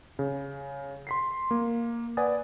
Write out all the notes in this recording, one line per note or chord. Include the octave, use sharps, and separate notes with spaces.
C#3
C6 B6 C7
A#3
B4 D5 F#5 G#5 D#6 A6